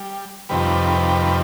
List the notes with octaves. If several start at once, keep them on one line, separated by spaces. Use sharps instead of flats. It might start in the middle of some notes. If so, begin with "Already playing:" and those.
Already playing: G3
F2 C3 D#3 G3 B4